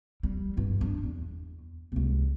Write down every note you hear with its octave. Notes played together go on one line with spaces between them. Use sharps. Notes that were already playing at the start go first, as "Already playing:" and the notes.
G3
G1 G2
D4
E2
C#2 C3